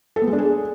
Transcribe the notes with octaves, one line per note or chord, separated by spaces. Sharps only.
A4
B3
G#3
D4
G#4